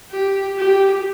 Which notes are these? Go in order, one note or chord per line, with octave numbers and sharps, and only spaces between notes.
G4
G4